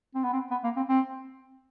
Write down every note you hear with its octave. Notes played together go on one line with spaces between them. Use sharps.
C4
B3
C4
B3
A#3
C4
C4